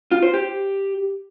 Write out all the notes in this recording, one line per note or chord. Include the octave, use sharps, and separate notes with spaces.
F4
C5
G4